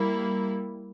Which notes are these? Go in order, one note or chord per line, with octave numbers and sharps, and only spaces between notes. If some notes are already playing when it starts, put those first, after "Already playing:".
Already playing: G3 A#3 E4